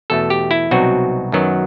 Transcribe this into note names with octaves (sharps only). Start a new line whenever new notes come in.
E2 B2 A3 A4
G4
E4
C2 B2 F#3 C4 D#4 F#4
F#2 D#3 F#3 B3